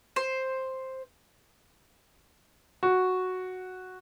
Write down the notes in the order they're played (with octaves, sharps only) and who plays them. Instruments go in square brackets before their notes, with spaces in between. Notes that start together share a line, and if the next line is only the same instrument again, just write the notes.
[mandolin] C5
[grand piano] F#4